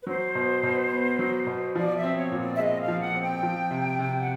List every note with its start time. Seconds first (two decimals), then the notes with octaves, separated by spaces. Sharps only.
0.01 B4
0.07 F#3 C5
0.35 B2
0.63 B2
0.92 B3
1.19 F#3
1.47 B2
1.75 F3 D5
1.96 E5
2.03 C4
2.17 C#5
2.32 A#2
2.39 D5
2.54 E5
2.59 G#3 D#5
2.80 F5
2.88 F3
3.01 F#5
3.15 C4
3.22 G5
3.43 F3
3.71 C3
3.99 C3
4.19 F#5